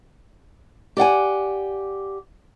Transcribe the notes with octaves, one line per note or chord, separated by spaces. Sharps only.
G4 D5 F#5 G#5